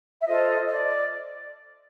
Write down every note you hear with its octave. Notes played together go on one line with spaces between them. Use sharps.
E5
F4 A4 C5 D#5
D#5
D5